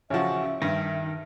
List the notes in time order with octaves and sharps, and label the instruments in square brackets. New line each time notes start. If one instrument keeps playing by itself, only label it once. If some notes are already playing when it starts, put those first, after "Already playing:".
[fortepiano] A1 C#3 F3 [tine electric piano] C#4 F#4 [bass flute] E5
[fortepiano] G2 [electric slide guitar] D#3 [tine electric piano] A#6